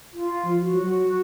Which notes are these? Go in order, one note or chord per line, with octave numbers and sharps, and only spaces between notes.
F4
F3
F#4
F#3